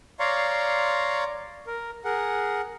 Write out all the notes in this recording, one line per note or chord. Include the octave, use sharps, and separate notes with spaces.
C#5 D5 F5 A#5 C6 C#6
A#4
G#4 A#4 F#5